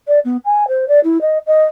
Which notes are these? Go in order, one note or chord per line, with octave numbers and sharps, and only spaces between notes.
D5
B3
G#5
C5
D5
E4
D#5
D#5